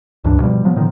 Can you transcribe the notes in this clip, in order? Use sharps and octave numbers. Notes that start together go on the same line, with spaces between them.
C#2 G2 E3 D4
B2 F3 G3
C3 F3 F#3 B3
A2 D3 D#3 F3